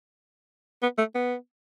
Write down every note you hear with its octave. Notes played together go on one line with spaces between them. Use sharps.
B3
A3
B3